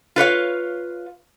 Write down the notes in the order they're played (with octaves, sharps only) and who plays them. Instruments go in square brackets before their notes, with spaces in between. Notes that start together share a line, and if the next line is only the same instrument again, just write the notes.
[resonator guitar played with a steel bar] F4 B4 C#5 F5